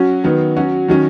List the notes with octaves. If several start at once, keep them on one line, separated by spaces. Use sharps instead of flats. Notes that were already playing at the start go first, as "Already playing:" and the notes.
Already playing: F#3 C#4 F#4
D#3 F#3 B3
F#3 C#4 F#4
D#3 F#3 C#4